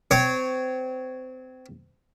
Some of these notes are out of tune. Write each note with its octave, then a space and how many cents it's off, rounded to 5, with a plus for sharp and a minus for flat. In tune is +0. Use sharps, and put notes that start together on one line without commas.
C4 -25 C#5 +0